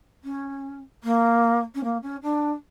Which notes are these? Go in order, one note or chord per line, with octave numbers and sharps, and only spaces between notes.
C#4
A#3
C#4
A#3
C#4
D4